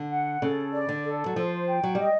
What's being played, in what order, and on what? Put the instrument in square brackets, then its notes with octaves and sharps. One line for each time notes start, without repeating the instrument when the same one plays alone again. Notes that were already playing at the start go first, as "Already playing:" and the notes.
Already playing: [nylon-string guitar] D3
[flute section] F#5
[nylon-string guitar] C#3 [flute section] A4
[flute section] D5
[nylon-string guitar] D3
[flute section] A4
[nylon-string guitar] F#3
[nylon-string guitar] F3 [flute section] C5
[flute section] G5
[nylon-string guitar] F#3
[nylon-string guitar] G3 [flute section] D#5